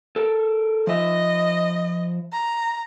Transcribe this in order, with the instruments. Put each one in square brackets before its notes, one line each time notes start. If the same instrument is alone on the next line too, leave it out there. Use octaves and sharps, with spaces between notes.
[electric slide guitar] A4 A#4
[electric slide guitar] F3 E5 [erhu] D#5
[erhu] A#5